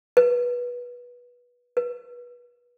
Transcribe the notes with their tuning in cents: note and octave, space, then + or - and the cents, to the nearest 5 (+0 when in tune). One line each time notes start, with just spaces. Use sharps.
B4 -20
B4 -30